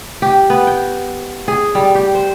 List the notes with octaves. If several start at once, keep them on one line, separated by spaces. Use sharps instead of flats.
G4
B3
G5
G#4
G3
G4
C5